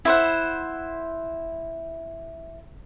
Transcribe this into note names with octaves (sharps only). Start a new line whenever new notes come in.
E4 C5 F#5